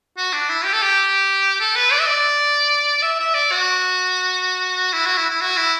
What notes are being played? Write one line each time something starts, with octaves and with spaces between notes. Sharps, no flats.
F#4
D4
E4
G4
A4
G4
A4
B4
D5
E5
D5
E5
E5
D5
F#4
E4
F#4
E4
E4
F#4
E4